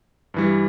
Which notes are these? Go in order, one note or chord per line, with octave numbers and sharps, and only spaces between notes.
G2 E3 G3